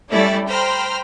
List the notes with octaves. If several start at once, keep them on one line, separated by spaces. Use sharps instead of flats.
G3 A3 C#4 E4 D5
C5 G5 A#5 B5 F6